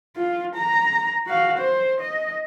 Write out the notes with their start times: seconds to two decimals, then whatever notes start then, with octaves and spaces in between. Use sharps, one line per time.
0.16 F4
0.55 A#5
1.26 F#4 F5
1.58 C5
2.00 D#5